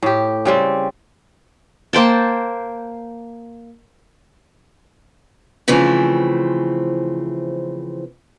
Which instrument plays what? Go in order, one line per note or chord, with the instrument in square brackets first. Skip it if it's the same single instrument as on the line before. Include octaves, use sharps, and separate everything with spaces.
[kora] A2 G4
C#3 G3 C4
[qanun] A#3 C5 G5 A5
[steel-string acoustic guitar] C#3 E3 F3 A3 C4